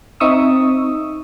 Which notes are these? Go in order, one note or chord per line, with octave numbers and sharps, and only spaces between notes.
C4 D#4 E5 C#6 D#6 E6